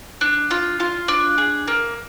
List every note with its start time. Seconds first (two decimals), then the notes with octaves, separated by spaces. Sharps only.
0.21 D4
0.51 F4
0.80 F4
1.08 D4
1.38 G#4
1.68 A#3